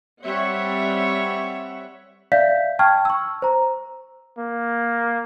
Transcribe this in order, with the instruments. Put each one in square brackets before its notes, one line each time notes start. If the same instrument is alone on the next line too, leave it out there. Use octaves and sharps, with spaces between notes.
[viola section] G3 C4 C#5 E5 F#5
[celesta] D5 E5 F5 G6 B6
G5 A5 C#6 F6 G#6
C#6 E6
C5 A#5
[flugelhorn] A#3